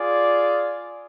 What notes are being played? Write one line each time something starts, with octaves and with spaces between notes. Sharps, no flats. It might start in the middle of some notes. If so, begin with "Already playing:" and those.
Already playing: F4 G#4 D5